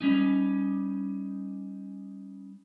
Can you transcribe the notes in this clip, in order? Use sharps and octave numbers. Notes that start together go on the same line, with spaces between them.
G3 C#4 D#4